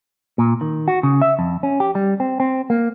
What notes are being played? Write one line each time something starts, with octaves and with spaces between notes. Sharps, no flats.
A#2
D#3
F#4
C#3
E5
F2
C#4
G4
G3
C4
C4
A#3